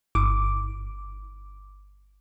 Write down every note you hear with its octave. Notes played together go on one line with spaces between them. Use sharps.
G1 D6